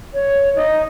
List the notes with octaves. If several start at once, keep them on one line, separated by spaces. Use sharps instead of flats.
C#5
D#4